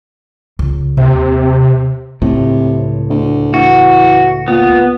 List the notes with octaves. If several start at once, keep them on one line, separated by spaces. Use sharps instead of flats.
C#2
D#2 C3
C#2 A2 C3
D2
E3 F#4
A#2 B3